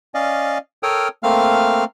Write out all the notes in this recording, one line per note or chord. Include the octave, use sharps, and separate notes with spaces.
C#4 D5 D#5 F5
A4 A#4 C#5 G5 D#6 F6
A3 A#3 C4 F5 F6